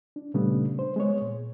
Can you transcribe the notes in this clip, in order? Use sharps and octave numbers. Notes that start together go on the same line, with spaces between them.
D4
A#2 C#3 G3 A3 B3 D4
C5
G#3 B3 C#5
A#2